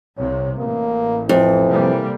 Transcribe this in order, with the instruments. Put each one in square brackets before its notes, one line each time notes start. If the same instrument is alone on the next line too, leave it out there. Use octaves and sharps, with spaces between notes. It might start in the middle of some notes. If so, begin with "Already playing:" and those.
[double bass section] C2 C3 [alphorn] C#5
[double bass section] A1 [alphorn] A#3
[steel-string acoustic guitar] F2 [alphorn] E3
[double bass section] C3 G3 A#3